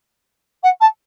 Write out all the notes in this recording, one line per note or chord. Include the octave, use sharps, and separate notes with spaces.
F#5
A5